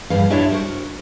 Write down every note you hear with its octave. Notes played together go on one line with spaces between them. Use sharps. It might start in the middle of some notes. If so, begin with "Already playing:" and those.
E2 G2 F3 F5
D4 E4 F4 G4 C#5 E5
F#4 A4 A#4 C5